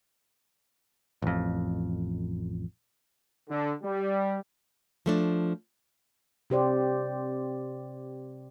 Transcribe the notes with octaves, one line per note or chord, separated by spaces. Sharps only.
A1 F2
D3
G3
F3 A3 D4
C3 G4 C5 D5